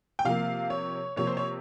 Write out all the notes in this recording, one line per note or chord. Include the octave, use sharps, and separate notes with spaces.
G5
C3 F3 A#3 F5
C#5
C3 F3 A#3 C#5
C5
C#5